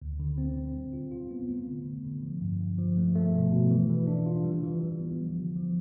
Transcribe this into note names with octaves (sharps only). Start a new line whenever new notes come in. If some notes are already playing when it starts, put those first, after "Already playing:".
D2
D3
C4
C4
G3
F4
F4
B3
A3
D3
D3
D3
F3
G2
G2
F3
A3
A3
B2
B2
E3
E3
D4
F4
G3
E3
E3
B3
F3
D3
F3